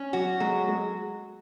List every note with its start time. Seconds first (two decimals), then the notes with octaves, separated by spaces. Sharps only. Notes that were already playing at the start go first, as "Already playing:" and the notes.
Already playing: C#4
0.13 F#3 F#4
0.40 F#3 G#3
0.68 G#3